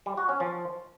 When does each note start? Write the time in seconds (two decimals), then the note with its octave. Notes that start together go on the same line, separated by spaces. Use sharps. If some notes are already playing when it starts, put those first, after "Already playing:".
0.06 G3
0.17 F#4
0.29 C#4
0.40 F3